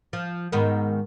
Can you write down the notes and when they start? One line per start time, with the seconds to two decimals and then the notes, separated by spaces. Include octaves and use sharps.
0.13 F3
0.52 G#2 D#3 B3